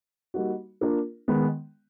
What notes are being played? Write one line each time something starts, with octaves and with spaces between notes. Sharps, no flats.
G3 A#3 D#4 F#4
A#3 D4 F4 A#4
D#3 G#3 B3